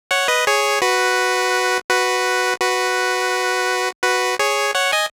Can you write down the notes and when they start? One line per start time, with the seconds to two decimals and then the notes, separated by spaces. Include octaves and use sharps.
0.11 C#5 F#5
0.28 B4 D#5
0.47 G#4 C#5
0.82 F#4 B4
1.90 F#4 B4
2.61 F#4 B4
4.03 F#4 B4
4.39 G#4 C#5
4.75 C#5 F#5
4.92 D#5 G#5